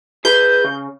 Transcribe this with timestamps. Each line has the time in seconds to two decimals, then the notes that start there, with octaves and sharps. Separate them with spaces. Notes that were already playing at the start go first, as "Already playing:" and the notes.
0.25 G#4 B4 G6
0.64 C#3